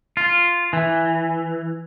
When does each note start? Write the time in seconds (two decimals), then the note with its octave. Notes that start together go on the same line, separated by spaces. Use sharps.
0.17 F4
0.73 E3